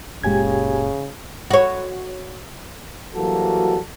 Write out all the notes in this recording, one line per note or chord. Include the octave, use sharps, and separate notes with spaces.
F#1 A#2 C#3 G#3 G4 G#5 G#6
F#4 C#5
E3 F#3 G3 A#3 F#4 A4